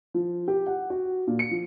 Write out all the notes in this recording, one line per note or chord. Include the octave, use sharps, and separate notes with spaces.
F3
G4
F#5
F#4
A#2
C#7
F3